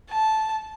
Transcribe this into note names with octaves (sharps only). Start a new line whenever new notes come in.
A5